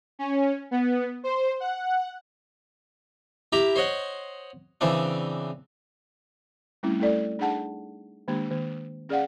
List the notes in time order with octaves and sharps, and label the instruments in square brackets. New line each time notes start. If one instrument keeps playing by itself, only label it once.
[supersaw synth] C#4
B3
C5
F#5
[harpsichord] E4 G4 E5 A#5
C5 C#5 D#5 F#5
C#3 E3 C4 D4
[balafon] G3 A3 C4 C#4 E4
A3 E4 A4 D5
D4 D#4 G#4 F#5 A5
D#3 G#3 A#3 D4 G4
D#3 A#3
C#4 G#4 D5 F5 F#5